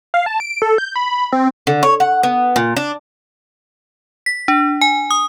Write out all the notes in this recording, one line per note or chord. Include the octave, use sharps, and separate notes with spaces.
F5
A5
D7
A4
G6
B5
C4
D3
C#5
F#5
B3
A#2
D4
B6
D4
G#5
D#6